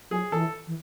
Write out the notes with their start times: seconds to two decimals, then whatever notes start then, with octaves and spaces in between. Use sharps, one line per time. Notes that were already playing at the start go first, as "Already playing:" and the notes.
0.11 F#3 G#4
0.32 E3 A4
0.67 E3